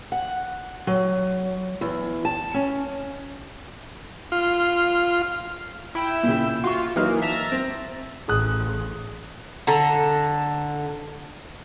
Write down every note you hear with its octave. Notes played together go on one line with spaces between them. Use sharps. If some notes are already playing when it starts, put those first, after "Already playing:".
F#5
F#3
E2
A5
C#4
F4
E4 G5 E6
A#2 C#3
F4 F#4 C#6
E3 F#3 A#3 D#4 F6
E5 A5 A#5
C4
A1 G#4 D#6 F#6
D3 A4 A#5